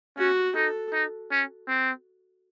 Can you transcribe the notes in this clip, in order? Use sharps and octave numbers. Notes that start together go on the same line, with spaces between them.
C#4 F#4
D#4 A4
D#4
C#4
C4